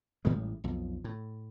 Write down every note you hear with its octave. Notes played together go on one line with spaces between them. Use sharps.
A1 A2 G3 G#3
B1 F2
A2